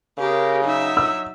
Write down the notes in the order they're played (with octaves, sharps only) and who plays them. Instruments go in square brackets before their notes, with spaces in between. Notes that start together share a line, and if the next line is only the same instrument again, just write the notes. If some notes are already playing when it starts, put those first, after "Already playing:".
[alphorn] C#3 [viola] G4 G#4 [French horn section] A#4
[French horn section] F#3 [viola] D#4 E5
[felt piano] E6